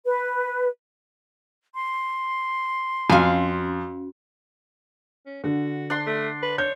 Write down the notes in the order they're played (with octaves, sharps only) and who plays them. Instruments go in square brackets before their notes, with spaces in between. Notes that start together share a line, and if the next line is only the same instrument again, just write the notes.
[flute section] B4
[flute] C6
[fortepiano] F2 [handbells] C#4 F#4 [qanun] F5 G#5
[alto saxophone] C#4
[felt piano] D3 [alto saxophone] F#4
[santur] D4 C6
[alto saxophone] A3
B4
[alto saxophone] C#5 [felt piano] G6